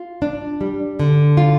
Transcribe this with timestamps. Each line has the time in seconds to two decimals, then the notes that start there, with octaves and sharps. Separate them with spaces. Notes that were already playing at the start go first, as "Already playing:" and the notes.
Already playing: F4
0.22 D4
0.61 G3
1.00 D3
1.37 F4